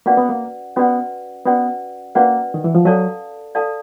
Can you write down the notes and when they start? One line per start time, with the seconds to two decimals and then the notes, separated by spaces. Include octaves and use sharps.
0.06 A#3 C#4 F#4 B4 D5 F#5
0.17 B3
0.29 A#3
0.76 B3 C#4 F#4 B4 D5 F#5
1.45 B3 C#4 F#4 B4 D5 F#5
2.15 A#3 C#4 F#4 B4 D5 F#5
2.54 D#3
2.64 E3
2.75 F3
2.85 F#3 A4 D5 F5 A5
3.55 A4 D5 F5 A5